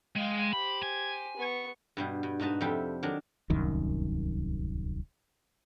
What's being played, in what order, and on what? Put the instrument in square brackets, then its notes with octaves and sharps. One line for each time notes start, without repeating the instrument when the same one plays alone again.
[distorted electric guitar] G#3 [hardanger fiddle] F5 G5
[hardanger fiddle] G4 C5 [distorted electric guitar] B5
[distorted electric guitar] G#5
[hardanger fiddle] B3 C#6
[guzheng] G2 B2 G3
G2
G#2 D#4 F#4 B4 A5
F2 C3 G3 A4 E5 G5
D#3 F#3 D4
[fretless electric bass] D1 C2 F#2 D#3